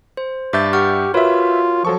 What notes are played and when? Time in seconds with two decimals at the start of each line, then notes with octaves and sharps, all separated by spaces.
0.17 C5
0.53 G2 E5 D6 G6 A6
0.73 G4 F#5 C#6 F6
1.14 F4 F#4 A#4 B4 C#5 E5
1.85 F3 F#3 A4 C#6